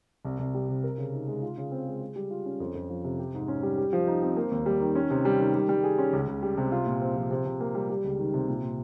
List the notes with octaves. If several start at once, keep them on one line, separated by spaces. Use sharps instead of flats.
C2
C2
G3
C3
A#4
C#3
D#4
G#3
F4
C#3
C4
G#3
G#4
G3
F4
C#4
F2
F2
F3
C3
G4
G#2
C#4
G3
G4
F3
D#4
C4
A#3
D#2
G3
D#3
C#4
C3
G3
D#3
G3
G3
G#4
C#4
C#2
C#2
G3
C3
F4
A#2
C4
F3
C3
C3
A#3
G3
G3
C#2
D#3
C3
A#2
A#2